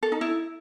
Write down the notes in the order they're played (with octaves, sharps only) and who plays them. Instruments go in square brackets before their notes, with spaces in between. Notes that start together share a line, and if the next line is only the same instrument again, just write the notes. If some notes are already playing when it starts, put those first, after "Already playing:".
[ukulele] A4
D#4
E4